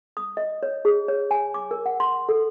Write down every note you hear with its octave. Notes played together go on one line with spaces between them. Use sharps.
D#6
D#5
C#5
G#4
C#5
G#5
D6
A#4
F#5
C6
A4